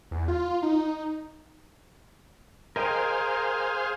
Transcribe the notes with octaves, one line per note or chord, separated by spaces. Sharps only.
E2
F4
D#4
G#4 A#4 C5 D#5 F5 G5